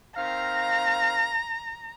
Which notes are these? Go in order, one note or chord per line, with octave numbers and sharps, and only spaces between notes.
D#3 C4 F5 A#5